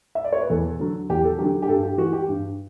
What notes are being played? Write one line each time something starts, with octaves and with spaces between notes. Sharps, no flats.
E5
D5
C#5
B4
E2 A4
D3 F#3
E2 G4
A4
D3 F#3 G4
G4
G2 A4
G4
E3 F#4
G4
G2